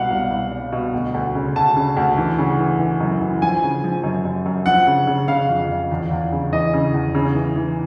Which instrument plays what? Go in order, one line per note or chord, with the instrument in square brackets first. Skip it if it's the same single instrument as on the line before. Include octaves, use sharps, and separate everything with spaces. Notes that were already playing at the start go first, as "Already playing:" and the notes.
Already playing: [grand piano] C2 B2 F5 F#5
C2
C2
G3
B2
D2
D2
C#3
D2 A5
C#3
D2
E3
C#3
E3
E3
F#2
E3
F3 G#5
C#3
F3
F#2
F#2
F#2
F3 F#5
C#3
C#3
C#3 F5
F2
F2
E2
E2
C#3
E3 D#5
C#3
E2
C#3
E3
E3